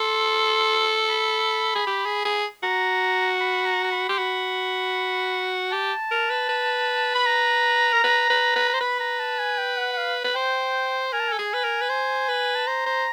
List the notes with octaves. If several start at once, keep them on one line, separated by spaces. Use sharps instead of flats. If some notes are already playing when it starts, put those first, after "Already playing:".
Already playing: A4 C6
B5
G#4
G4
G#4
G#4
F#4 A#5
B5
A#5
A#5
B5
G4 C6
F#4 B5
G4 A5
A#4
B4
B4
B5
A#5
A#4
B4
B4
B4
C5 A#5
B4 B5
A#5
A5
G#5
G5
F#5
F#5
F5
B4
C5 G5
A#4 G#5
A5
A4 G#5
G#4
B4
A#4
B4
C5
B4
A5
C5 A#5
C5